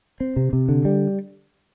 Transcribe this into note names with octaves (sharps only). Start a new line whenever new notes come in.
C4
C3
C3
D3
G3